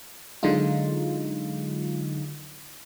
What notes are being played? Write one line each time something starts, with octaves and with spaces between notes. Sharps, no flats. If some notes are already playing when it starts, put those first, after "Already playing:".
D3 F#3 G#3 D#4 F4